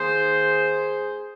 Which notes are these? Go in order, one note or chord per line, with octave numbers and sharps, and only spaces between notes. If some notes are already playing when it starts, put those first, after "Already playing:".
Already playing: D#3 A#3 G#4 C5